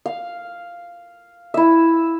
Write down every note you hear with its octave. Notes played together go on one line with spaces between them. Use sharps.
F5
E4 E5